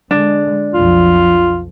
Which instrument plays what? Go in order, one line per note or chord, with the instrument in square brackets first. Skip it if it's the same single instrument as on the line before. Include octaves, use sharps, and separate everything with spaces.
[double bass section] D3 G#3 [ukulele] D4
[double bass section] B1 F2 F3 [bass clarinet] F4